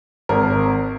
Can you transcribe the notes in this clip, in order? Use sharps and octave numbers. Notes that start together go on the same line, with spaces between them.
G#1 A#4